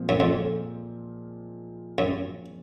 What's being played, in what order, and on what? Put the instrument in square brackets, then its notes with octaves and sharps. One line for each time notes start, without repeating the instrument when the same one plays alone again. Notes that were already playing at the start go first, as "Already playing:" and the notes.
Already playing: [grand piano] A#2 F3 G#3 C4
[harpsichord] F#2
F2
F#2